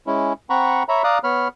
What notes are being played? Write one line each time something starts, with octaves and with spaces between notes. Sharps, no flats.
G#3 C#4 E4
C4 F#5 A#5 B5 C#6
C#5 E5 A#5 B5
D5 F5 A#5 D#6 F#6
B3 C#5 B5 F6